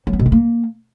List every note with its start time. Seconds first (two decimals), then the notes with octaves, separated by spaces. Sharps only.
0.07 F#3
0.13 B3
0.19 B2
0.26 B3
0.32 A#3